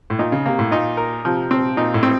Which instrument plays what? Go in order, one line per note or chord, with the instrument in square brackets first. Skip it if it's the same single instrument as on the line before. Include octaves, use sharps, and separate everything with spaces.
[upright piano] A2
[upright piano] A#2 [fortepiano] D#4
[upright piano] C#3
[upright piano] C3 [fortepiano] A#3
[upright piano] A2
[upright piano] A#2 [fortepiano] D#4
[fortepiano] A#4
[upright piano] C3 [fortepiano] F3
[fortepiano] C4
[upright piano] A#2 [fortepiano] D#4
[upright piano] A2
[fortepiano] C4